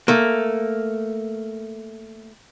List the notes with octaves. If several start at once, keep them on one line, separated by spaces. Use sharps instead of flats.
A3 A#3